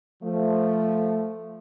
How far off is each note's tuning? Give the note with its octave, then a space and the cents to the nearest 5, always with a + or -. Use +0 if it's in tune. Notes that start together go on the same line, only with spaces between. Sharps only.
F3 +0 A3 +0